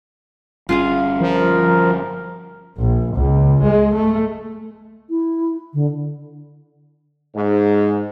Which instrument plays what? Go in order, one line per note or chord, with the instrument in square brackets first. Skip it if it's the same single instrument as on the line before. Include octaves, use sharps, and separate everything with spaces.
[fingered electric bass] G1 G3 C#4 [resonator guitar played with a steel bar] F4 G#4 F5
[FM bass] F3 [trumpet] A#4
[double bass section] A#1
C#2
G#3
A3
[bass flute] E4
D3
[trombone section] G#2